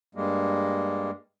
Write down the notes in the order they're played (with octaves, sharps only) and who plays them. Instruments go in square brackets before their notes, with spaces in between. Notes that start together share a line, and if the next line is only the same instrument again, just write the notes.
[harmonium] G2 G3 G#3 A#3